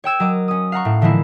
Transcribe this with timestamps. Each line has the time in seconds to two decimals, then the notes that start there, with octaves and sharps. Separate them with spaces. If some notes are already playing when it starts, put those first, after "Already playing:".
0.04 C#5 G5 E6 G#6
0.20 F#3 A#4 D#5 D6
0.48 C#4 D#6
0.72 F5 F#5 A#5 C#6
0.85 A2
1.01 D3 E3 F3 G#3 A#3 E4